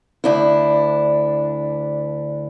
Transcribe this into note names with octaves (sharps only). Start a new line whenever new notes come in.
D2 D4 E4